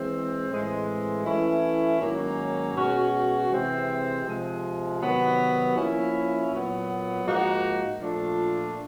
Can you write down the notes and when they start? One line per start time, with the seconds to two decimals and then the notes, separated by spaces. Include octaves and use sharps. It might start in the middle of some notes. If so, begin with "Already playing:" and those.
Already playing: E3 G#3 C4
0.50 A2 E3 G#3 C4
1.25 E3 A3 C#4 E4
2.00 G#2 D#3 F#3 A#3 C#4
2.75 B2 G#3 C#4 F#4
3.50 C3 E3 G#3 C4
4.25 C3 F3 G#3
5.00 C3 D#3 F#3 B3
5.75 F3 A#3 C#4 E4
6.51 A#2 F#3 B3
7.26 G#2 F3 A#3 D#4 F#4
8.01 A#2 F3 A3 D4 F4